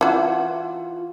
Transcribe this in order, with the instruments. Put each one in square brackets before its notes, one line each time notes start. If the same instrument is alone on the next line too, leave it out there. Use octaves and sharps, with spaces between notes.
[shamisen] E3 F#4 [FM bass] F4